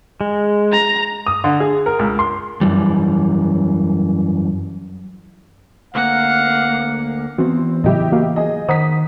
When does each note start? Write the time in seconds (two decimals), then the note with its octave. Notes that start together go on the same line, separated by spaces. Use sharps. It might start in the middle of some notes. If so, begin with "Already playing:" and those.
0.21 G#3
0.72 A#5
1.26 D#6
1.44 D3
1.60 G#4
1.86 A#4
1.99 C#2
2.19 C6
2.61 F#2 C3 E3 G3
5.95 D2 A#3 F5 F#5
7.38 E3 B3 C4 F#4
7.84 A2 C#3 F#3 E4 G4 D#5
8.12 A#3 F#4 F5
8.36 G#4 D#5
8.69 D#3 C5 F#5 A#5 D#6 B6